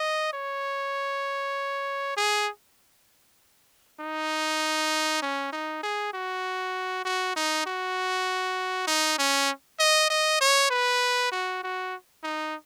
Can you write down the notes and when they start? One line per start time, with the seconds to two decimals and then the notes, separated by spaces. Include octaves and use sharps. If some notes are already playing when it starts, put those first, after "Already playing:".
Already playing: D#5
0.33 C#5
2.17 G#4
4.00 D#4
5.22 C#4
5.53 D#4
5.83 G#4
6.14 F#4
7.05 F#4
7.36 D#4
7.66 F#4
8.88 D#4
9.18 C#4
9.80 D#5
10.10 D#5
10.41 C#5
10.70 B4
11.32 F#4
11.63 F#4
12.23 D#4